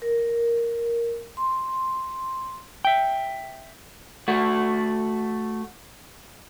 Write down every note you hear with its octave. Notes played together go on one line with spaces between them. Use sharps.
A#4
C6
E5 G5
A3 F#4